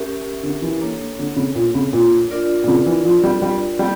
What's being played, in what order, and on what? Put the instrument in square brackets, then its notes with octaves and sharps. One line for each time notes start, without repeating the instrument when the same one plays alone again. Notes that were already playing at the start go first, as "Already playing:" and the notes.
Already playing: [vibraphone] C#4 G4 A#4 E5
[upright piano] D3
E3
[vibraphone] A#3 D4 A4 C#5
[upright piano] D3
C#3
A#2
C#3
A#2
[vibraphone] D4 F4 A#4 D5
[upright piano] A#2
C#3
E3
F3
G3
G3
[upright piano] G3 [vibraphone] A#3 E4 G4